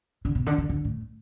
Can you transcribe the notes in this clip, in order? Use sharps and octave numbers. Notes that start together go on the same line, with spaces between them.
D3
B2
D3
D3
D3
A2